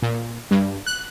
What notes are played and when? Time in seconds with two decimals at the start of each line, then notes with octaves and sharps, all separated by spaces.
0.02 A#2
0.51 G2
0.86 F#6